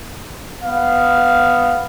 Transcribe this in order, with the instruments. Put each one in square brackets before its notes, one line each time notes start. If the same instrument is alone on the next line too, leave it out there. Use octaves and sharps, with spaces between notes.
[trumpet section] B3 F5